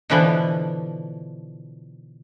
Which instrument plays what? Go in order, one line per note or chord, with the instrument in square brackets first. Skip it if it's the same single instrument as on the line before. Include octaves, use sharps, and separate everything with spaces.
[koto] B2 D3 E3 F3 B3